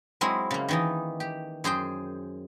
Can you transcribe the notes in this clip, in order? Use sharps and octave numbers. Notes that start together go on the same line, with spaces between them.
F#3 G#3 C4 E4
C#3 A#3
D#3 E3 D#4
G4
F#2 G#4 C5 G5